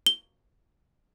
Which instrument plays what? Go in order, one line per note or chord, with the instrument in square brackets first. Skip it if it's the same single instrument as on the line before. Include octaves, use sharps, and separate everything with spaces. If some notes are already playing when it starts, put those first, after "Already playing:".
[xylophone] G7